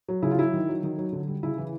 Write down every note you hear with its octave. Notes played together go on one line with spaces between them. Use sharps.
F#3
C#3 E4
F4
F#3 E4
D#3
F#3
D#3
F#3
D3
G3
C#3 E4
E3